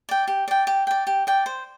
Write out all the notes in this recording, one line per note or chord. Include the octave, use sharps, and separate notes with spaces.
D5 G5
G4
D5 G5
G4
D5 G5
G4
D5 G5
C5